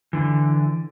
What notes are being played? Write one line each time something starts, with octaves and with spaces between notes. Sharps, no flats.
D3 E3